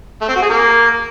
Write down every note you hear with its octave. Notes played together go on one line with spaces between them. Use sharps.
A3
C4
F#4
G#4
A#3